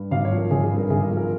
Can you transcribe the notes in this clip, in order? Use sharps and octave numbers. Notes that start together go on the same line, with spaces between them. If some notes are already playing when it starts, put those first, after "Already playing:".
Already playing: G2
G#1 F5
C#5
F3
A#4
G#1 G#4
G#4
G2
A#4
G#1 G#4
A#4
F3
A#4